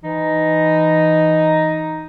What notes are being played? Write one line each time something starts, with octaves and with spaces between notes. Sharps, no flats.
E3 D#4